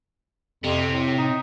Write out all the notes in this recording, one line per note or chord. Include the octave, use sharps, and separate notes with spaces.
F2 C3
A2
D#4